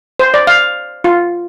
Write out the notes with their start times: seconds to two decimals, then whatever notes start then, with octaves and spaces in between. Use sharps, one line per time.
0.19 C5
0.34 D5
0.47 F5
1.04 F4